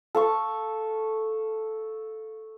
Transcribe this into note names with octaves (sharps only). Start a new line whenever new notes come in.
A4 F5 C#6